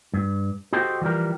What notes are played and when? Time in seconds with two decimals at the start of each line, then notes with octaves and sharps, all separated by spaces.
0.14 G2
0.73 F#4 G4 A4 C5 D#5 G5
1.01 E3 F3 G3 G4 A#4